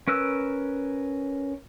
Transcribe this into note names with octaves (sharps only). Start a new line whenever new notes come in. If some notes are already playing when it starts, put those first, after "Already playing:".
C#4 A#4 B4 E6